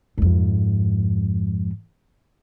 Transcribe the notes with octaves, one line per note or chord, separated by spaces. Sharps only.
F2 G#2